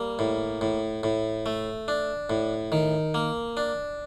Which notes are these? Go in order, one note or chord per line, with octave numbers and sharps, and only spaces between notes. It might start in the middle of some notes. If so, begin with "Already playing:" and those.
Already playing: G3 A#3
A2
A2
A2
A3
D4
A2
D#3
A#3
D4